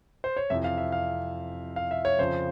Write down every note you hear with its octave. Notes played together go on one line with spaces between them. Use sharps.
C5
C#5
F2 C3 E3 E5
F5
E5
F5
F5
E5
C#5
F2 C#3 F3 C5